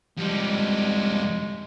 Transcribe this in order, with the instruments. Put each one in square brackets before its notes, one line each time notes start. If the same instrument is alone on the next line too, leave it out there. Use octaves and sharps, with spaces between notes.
[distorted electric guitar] F2 G3 [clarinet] G#3